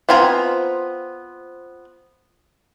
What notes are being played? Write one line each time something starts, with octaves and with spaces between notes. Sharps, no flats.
B3 C4 F4 G#5 A#5